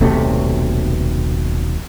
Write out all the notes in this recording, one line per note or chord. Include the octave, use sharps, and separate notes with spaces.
D#1 B1 C3 A3